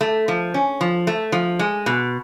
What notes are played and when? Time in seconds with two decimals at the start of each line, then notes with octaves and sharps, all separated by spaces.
0.01 A3
0.28 F3
0.54 C#4
0.81 F3
1.07 A3
1.32 F3
1.59 G#3
1.86 B2